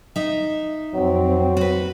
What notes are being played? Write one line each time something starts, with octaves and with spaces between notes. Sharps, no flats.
D#4 E5
F2 F#3 C4
F#4 B4